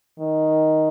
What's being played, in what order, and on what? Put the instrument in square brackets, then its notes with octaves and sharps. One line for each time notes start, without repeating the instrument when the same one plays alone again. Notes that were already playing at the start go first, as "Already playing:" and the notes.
[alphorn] D#3